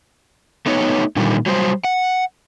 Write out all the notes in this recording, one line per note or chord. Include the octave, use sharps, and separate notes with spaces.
A3 B3 D#4 C#5
A#2 D3 D#3 G3
F#3 G3 C5
F#5